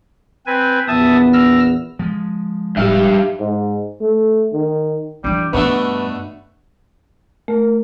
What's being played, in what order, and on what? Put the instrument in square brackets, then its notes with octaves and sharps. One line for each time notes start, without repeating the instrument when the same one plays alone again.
[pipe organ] C4 B4 G#5
[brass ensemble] A#1 E2 B3 [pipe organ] E5 A5 D#6
[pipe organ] E6 F6 A#6
[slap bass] F3 G#3
[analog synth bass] D1 [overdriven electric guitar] G2 F5 [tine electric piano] G4 E5
[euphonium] G#2
A3
D#3
[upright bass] E3 D4 [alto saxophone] G3
[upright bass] G2 [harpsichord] B2 D3 A3 [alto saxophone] B4
[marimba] A3 [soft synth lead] A#4